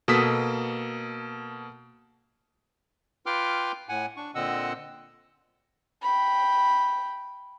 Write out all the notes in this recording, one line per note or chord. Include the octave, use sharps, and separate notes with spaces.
B2 A#3 A4 D#6 B6
F4 B4 G5 C6 D6 F6
A2 F#5 G#5
D4 C#6
A#2 D3 C4 D#5 F#5 E6
G5 B5